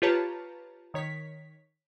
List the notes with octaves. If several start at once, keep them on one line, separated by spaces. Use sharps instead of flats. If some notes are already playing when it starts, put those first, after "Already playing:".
F4 G4 B4 C#5 A5 A#5
D#3 C#5 B6